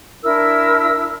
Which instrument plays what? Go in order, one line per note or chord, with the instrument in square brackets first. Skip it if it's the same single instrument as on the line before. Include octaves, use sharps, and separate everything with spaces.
[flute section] D4 E4 A#4 E6